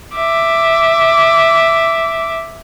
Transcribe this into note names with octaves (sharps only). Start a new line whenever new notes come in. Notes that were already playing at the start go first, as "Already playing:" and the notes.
E5 D6